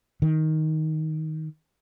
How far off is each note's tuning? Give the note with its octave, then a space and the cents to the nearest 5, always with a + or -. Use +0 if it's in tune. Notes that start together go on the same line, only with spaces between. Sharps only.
D#3 +10